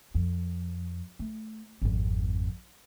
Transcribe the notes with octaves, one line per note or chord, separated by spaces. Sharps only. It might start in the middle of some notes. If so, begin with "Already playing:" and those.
F2
A3
G#1 F2